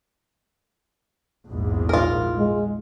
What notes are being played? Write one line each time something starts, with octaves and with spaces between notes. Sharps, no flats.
A#1 E2 G#2
F4 A#4
G#3